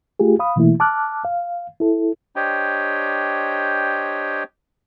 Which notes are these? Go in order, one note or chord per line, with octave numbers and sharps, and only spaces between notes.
A3 F4 G4 G#4
F5 B5 D#6
B2 E3 A3 A#3 E4
A5 D6 F6 F#6
F5
E4 A4
D4 G4 C5 C#5 D#5 G5